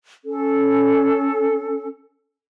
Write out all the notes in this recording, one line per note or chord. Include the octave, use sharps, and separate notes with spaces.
C#4 A4